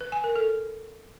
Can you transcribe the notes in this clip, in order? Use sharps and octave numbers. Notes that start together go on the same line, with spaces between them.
B4
G#5
A#4
A4